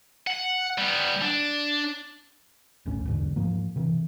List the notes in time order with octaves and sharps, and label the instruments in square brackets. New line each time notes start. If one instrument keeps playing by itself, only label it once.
[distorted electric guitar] F#5
G3 B3
D4
[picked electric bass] D1 A1 D#2 C#4
B1 E2 G#2 D3
G#2 F3 A#3
C3 E3